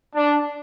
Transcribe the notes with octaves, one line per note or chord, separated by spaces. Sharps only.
D4